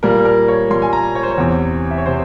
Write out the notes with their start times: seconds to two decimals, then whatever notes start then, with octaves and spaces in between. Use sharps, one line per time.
0.03 A#2 G3 A#3 A#4
0.25 A#4
0.48 C#5
0.70 A#2 G3 A#3 C6
0.82 G#5
0.93 A#5
1.15 C#5
1.23 C5
1.31 C#5
1.38 E2 C3 E3
1.91 E5
1.98 C#5
2.06 C3 C5